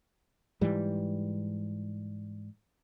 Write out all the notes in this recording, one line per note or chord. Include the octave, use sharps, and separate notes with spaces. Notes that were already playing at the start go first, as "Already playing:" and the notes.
G#2 E3 G3